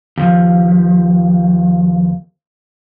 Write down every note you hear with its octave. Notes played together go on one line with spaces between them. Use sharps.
D#2 F3